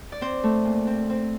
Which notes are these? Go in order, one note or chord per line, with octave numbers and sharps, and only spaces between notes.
D5
C4 C5
A3
A#2
C4
C4